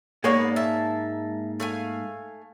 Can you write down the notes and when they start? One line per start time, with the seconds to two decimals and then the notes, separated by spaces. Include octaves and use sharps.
0.24 G#2 G#3 A#3 B3 C#5 D5
0.56 E5 A5
1.60 A3 F5 G#5